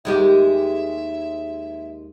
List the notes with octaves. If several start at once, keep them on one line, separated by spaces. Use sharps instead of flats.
D#2 G#3 G4 E5